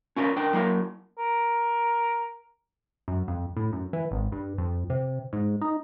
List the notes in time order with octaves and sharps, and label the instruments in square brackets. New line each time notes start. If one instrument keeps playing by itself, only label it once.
[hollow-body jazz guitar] C#4 F4 A#4 B4
D4 A#4 G5
F#3 A#3 E4 A#4
[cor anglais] A#4
[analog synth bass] F#2
F2
A2
F#2
E3
G#1
G2
F2
C3
G#2
D#4